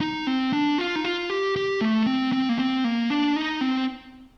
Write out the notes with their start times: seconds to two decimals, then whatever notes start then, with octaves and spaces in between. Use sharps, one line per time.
0.01 D#4
0.27 C4
0.53 D4
0.78 F4
0.96 D#4
1.04 F4
1.30 G4
1.56 G4
1.81 A3
2.06 C4
2.33 C4
2.49 A#3
2.59 C4
2.84 A#3
3.10 D4
3.36 D#4
3.61 C4